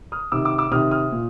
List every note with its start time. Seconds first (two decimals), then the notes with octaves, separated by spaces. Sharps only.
0.12 D#6 F6
0.32 C3 D#3 D6 E6
0.45 D6 E6
0.58 D6 E6
0.72 C3 D#3 D#6 F6
0.91 D#6 F6
1.12 A#2